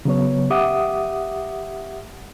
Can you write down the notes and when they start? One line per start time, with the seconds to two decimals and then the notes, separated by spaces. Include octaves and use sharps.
0.05 C#3 F#3 B3 C#5
0.50 G4 E5 F#5 D6 D#6